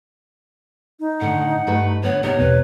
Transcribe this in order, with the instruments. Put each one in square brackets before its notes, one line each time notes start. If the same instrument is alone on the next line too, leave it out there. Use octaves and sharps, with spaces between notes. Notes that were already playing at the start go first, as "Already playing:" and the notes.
[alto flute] D#4
[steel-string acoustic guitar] A2 D3 D#3 [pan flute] F#5
[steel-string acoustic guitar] G2 A3 B4
[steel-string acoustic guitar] D3 B3 B4 [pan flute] C#5
[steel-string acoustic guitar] D2 C3 D#4 [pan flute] B3 [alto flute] C#5
[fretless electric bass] E2 B2 [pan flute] B4